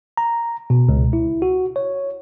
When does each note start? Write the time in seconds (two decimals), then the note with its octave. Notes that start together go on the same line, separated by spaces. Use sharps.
0.17 A#5
0.70 B2
0.89 C#2
1.13 E4
1.42 F#4
1.76 C#5